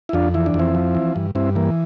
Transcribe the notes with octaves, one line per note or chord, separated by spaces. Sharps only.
E4
F2 D4 F4
E3 E4
D4
F2
C4 E4
F3
E3
G2
G2 C4 E4
E3 A#3